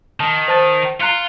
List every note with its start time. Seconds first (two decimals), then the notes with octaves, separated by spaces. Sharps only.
0.20 D#3 A5
0.48 C5 A5 A6
1.01 F4 A#5 F#6 C#7